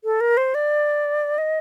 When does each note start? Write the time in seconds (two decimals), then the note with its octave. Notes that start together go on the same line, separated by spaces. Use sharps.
0.04 A4
0.21 A#4
0.37 C5
0.55 D5
1.38 D#5